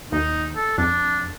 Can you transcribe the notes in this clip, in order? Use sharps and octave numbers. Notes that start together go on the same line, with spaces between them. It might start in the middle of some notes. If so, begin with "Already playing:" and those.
D#2 D#4
A4
F2 D4